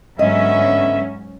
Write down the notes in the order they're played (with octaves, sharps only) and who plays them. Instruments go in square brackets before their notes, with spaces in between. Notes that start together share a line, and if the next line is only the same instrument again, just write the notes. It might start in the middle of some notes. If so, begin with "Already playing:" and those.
[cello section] G#2 F#3 C#4 [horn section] D3 B3 E5 [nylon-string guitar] D#5